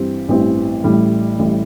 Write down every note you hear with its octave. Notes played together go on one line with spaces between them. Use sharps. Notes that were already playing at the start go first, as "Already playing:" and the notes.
Already playing: G2 E3 C4 G4
A1 G2 E3 C4 G4
A1 A2 G3
A1 A2 G3